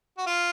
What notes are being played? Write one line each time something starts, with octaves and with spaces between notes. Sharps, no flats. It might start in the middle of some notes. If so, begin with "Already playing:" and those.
F#4
F4